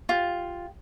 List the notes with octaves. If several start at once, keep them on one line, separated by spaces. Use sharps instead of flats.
F4 G4 F5